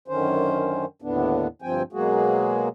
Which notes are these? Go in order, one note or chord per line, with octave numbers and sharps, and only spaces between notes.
F#2 D3 D#3 C#4 C5
D#2 A2 D3 B3 D4
D2 G2 F3 C4 G5 G#5
B2 F#3 G#3 A#3 F#4 G#4